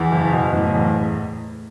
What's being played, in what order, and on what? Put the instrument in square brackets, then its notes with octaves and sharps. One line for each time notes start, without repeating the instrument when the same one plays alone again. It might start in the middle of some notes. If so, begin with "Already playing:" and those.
Already playing: [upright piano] E2 [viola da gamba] E3
[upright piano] F#1
B2
[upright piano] F#1 [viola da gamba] A2
[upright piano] E2